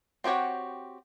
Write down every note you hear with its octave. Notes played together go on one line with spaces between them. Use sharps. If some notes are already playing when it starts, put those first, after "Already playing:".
C4 F#4 G4 C#5 F#5